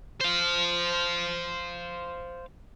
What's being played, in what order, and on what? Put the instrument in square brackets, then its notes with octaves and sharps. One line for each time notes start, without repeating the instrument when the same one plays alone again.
[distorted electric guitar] C5 F5